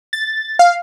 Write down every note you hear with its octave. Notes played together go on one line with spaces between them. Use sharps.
A6
F5